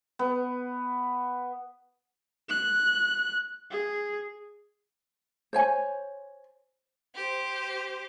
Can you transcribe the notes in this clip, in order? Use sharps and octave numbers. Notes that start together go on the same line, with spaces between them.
B3
F#6
G#4
C5 C#5 G#5
G4 C5